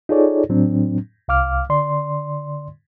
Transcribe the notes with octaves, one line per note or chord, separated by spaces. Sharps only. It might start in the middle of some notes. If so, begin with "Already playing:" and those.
D#4 F4 G#4 A4 C#5 D5
A2 F#3 C4 D4
C2 F5 D6 F6
D3 D5 C6